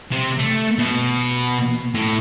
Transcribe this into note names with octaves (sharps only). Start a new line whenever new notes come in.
C3
A3
B2
A2